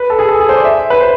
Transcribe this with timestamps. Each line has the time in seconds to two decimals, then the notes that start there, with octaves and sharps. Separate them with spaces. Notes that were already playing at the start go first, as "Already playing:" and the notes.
Already playing: B4
0.10 A4
0.19 G#4
0.29 A4
0.40 G#4
0.49 C5
0.56 D5
0.65 E5
0.90 B4
1.00 C5